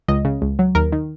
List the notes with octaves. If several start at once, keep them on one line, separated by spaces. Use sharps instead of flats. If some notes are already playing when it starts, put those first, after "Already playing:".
C#2 D#5
C#3
C#2
F#3
D#2 A#4
D#3